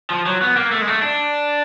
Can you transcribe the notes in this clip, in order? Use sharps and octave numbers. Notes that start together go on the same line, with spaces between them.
F3
F#3
B3
A#3
A3
G#3
A3
D4